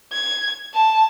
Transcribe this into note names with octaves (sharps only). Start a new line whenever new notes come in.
G#6
A5